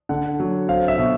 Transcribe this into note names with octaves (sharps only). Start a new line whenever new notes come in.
D3 F#5
F#3
C4 F5
E5
B2